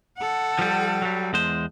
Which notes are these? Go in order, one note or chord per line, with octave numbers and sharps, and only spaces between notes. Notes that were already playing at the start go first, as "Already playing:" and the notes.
A4 F#5
F3 G3
F#3 G3
E2 G#3 C5